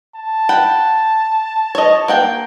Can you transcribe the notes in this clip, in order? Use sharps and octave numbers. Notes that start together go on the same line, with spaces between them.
A5
F#5 G5 B5
C#5 D#5
A#3 F#5 G5